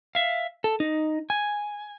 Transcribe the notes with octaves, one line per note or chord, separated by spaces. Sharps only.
E5 F5
A4
D#4
G#5